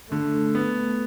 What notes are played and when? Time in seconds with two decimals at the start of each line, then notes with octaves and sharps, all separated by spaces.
0.12 D3 A3
0.55 A3 B3